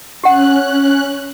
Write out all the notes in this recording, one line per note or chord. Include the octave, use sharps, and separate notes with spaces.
C#4 G4 F#5 F#6